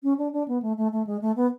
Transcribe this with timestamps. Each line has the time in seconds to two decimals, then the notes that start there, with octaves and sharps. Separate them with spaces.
0.03 C#4
0.18 D4
0.33 D4
0.48 B3
0.62 A3
0.77 A3
0.92 A3
1.07 G#3
1.22 A3
1.36 B3